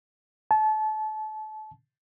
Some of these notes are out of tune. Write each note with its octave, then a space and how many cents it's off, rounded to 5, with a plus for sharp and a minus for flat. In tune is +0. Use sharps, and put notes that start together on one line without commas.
A5 -30